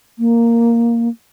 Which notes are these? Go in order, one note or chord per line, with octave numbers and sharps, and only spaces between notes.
A#3